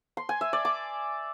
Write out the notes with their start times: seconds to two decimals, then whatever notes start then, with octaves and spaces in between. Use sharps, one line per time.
0.17 C6
0.29 G#5
0.41 E5
0.53 D5
0.65 D6